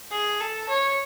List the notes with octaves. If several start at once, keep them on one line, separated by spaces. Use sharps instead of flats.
G#4
A4
C#5